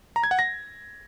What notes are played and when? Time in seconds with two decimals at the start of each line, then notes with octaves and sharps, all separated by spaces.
0.16 A#5
0.24 G#6
0.31 F#5
0.39 A#6